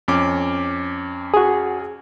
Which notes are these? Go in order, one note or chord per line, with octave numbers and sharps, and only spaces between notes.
F2 C#4 D6
F#4 G#4